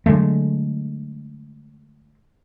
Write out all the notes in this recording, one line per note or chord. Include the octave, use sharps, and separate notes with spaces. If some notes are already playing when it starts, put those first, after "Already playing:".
D3 F#3 G#3 A3